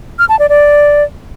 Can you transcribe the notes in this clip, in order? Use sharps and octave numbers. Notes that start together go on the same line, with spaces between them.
F6
A5
D5
D5